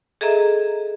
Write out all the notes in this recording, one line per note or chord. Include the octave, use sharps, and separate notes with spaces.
G#4 A4 D#5 E5 A#5